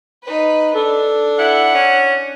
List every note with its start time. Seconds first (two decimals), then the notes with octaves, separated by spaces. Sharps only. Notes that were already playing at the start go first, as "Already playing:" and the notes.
0.23 D#4 B4
0.75 D4 A4
1.39 E4 F#5
1.75 C#4